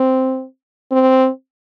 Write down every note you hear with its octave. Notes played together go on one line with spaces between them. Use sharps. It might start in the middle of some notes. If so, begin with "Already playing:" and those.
Already playing: C4
C4